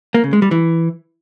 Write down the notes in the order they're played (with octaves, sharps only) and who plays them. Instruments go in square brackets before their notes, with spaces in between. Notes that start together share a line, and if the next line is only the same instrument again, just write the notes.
[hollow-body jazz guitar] A#3
C#3
G#3
G3
E3